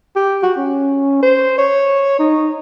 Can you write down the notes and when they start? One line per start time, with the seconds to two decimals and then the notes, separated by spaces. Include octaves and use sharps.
0.16 G4
0.43 F#4
0.58 C#4
1.23 C5
1.58 C#5
2.19 D#4